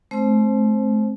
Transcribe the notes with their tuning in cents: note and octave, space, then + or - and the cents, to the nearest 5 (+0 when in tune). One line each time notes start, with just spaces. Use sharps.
A3 -40 C4 +5 C5 +10